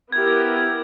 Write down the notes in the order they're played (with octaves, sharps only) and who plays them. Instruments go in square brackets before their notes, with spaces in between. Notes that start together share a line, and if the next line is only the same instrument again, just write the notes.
[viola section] B3 E4 G4 A#4 [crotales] G#6
[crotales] G#6
G#6
G#6